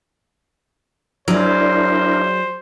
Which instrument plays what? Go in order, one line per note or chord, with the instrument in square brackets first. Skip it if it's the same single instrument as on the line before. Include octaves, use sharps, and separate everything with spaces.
[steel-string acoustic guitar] F#3 G#4 D5 [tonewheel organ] D4 E4 A#4 [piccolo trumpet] C5